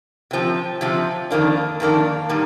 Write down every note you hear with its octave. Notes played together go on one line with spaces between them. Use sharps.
C3 F3 C4
C3 F3 C4
F2 D#3 A#3 D4
F2 D#3 A#3 D4
A#2 G3 A#3 D#4